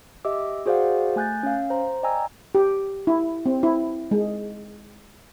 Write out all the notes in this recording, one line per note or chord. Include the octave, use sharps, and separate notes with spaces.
G4 D#5 E5 D6 E6
F#4 G#4 C5 D5 F5 F#5
A3 G#5 F#6 G6 A6
C#4 F5
C5 A#5
D5 D#5 G5 G#5 A#5 E6
G4
E4
C4
E4
G#3